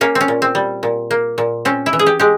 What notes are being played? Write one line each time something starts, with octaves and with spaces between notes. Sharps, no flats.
A#3 C#4
C4
C#4
A#2
C4
G3
A#2
A#3
A#2
C4 C#4
E4
E3
G#4
G4
G#3 G4